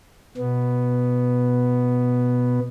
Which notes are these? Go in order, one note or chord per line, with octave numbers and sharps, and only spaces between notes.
B2 B3